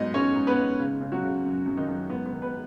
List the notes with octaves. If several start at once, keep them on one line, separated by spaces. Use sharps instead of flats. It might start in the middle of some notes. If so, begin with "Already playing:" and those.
Already playing: G#2 F#3 B3 D#4 D#5
G#2 C#4 C#5
G#2
B3 B4
G#2
C#3
C#3
F#3 F#4
C#3
F#2
F#2
D#3 D#4
F#2
G#2 B3
B3
D#3
B3 B4